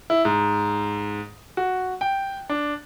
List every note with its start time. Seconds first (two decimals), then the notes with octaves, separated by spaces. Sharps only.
0.10 E4
0.25 G#2
1.57 F#4
2.01 G5
2.49 D4